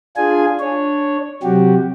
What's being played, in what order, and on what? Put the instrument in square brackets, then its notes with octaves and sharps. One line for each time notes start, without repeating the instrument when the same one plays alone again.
[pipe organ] D4 F4 G#4 G#5
D4 C#5
C3 F#3 F#4 G4